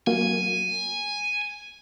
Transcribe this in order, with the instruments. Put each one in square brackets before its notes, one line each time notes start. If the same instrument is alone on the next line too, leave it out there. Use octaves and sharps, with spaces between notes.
[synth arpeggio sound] F#3 A#3 [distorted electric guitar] G#5